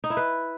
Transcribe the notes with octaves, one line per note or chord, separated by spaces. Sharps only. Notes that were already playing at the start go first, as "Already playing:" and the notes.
D#4
E4
B4